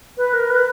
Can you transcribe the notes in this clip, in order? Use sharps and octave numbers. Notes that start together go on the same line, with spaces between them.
B4
A#4
B4